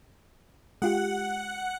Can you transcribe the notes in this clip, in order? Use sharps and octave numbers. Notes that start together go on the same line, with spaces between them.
G#3 F4 G4 F#5